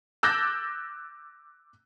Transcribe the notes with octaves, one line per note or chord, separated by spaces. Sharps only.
D6 E6 F#6 G6 A6 A#6